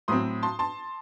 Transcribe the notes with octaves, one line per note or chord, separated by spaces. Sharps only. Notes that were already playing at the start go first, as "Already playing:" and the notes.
A2 F#3 C4 C6 D#6
A5 C6
A5 C6